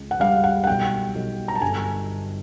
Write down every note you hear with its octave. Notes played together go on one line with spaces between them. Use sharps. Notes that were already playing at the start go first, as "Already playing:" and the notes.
Already playing: C#2
F#5
G3 F5
F#5
F#5
B1 G5
B1
A#5
A5
G1 G#5